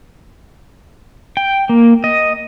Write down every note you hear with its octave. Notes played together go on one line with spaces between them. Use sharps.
G5
A#3
D#5